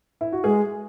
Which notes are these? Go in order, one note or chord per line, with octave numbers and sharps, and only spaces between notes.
E4
F#4
G#3 G#4